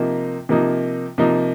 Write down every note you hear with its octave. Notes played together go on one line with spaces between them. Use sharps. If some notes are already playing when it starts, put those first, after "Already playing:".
Already playing: C3 F3 A#3 D#4
C3 F3 A#3 D#4
C3 F3 A#3 D#4